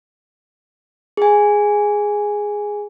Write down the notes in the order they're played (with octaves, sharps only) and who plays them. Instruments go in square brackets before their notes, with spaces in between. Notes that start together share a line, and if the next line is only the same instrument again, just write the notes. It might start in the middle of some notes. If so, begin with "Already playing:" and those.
[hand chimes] G#4 G#5